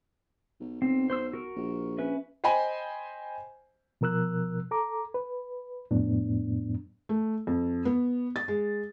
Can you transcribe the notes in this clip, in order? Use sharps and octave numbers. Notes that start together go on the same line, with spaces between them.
B1
B1 C4
C5 C6 E6
F#4 A#4
A#1
C#4 B4 E5
C5 D#5 G5 G#5 B5
B2 F3 A#4 E6 F#6
A4 A#5 D6
B4
F2 A2 F#3 B3 D4
A3
F2
B3
A6
G#3